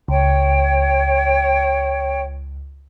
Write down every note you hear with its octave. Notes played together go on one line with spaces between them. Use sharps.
C#2 C#5 G5